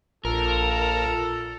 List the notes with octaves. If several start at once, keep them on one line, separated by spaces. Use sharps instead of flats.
A#1 F4 A4 A#4